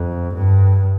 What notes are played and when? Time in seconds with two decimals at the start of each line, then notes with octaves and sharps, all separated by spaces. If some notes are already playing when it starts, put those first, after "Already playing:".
Already playing: F2
0.34 G2